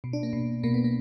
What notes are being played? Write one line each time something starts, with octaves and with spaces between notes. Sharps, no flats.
B2
D4
A#3
B2
B2 A#3
B3
A#3